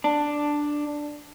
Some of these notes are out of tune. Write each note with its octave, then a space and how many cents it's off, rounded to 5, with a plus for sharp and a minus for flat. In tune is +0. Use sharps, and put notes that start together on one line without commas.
D4 +5